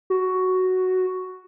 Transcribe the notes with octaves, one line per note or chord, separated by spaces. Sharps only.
F#4